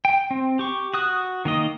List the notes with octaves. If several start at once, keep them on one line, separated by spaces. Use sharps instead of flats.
G5
C4
G4 C#6
F#4 D#6 F#6
D#3 A#3 D#5